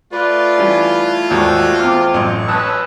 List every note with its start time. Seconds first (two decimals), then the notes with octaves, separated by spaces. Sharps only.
0.13 A3 F4 B4 D5
0.58 E3 G3 C#4
1.31 D#2 G#2 F#4 A4 D5 E6
1.80 E2 C4 D6 F6
2.14 A1 F#2 C#6
2.49 C#4 B4 A5 D#6 E6 F#6